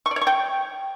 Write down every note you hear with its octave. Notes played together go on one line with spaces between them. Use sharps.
C#6
D5
C#5
C#6
G5